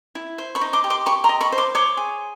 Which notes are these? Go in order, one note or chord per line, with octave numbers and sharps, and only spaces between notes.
E4
C5
B5 C#6
D#4
C6 D6
G4
C6 D6
G4 B5 C#6
A#5 C6
D#5
B5 C#6
C5
C6 D6
C#5 C6 D6
G#4